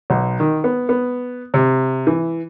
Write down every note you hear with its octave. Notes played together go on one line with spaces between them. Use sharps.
B1
D#3
B3
B3
C3
E3